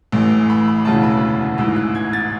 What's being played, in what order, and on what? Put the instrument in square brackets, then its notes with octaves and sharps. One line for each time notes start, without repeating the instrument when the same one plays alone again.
[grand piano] A1 A2 E3
B5
B5
E1 D2 C#3 E3 A5
B5
A1 G#2 E3 E6
F#6
G#6
A6